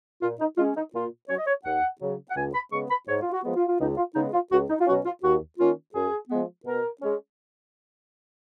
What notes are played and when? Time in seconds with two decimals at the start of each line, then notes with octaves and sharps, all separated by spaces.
0.22 A#2 F4
0.40 D#4
0.57 G#3 C#4 F4
0.75 D#4
0.93 A#2 F4
1.29 F#3 C#4 C#5
1.37 D#5
1.47 C#5
1.65 D#2 F#5
2.01 C#3 F#3
2.30 F#5
2.36 C#2 G#5
2.54 B5
2.72 C#3 G#3 B3 C#6
2.90 B5
3.08 G#2 C#5
3.21 F4
3.32 F#4
3.44 F3 G#3 B3
3.56 F4
3.68 F4
3.80 C#2 D#4
3.97 F4
4.15 C#3 G#3 B3 D#4
4.33 F4
4.52 C#2 F#4
4.69 D#4
4.80 F4
4.87 B2 F#3 C#4 F#4
5.05 F4
5.23 D#2 F#4
5.59 D#3 A#3 C#4 F4
5.94 F#2 G#4
6.30 F3 G#3 B3
6.66 B2 A#4
7.02 G#3 C#4